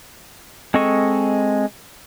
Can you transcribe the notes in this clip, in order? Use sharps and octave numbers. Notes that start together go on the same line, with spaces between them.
G#3 C4 A4 D#5 C#6